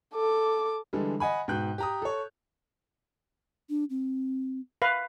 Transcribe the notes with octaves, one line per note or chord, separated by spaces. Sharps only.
A4 D6
D3 E3 G3 G#3 A4
D#5 F#5 G#5 B5
G#2 B2 G5 F#6 G6
G4 A#5 D#6
A4 C#5
D4
C4
B4 F5